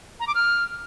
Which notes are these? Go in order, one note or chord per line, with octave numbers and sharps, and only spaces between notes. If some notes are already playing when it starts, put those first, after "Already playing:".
A#5
D6
F6